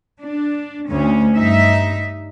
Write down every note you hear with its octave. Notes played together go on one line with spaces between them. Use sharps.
D4
D2 C#4
G2 D#4 E5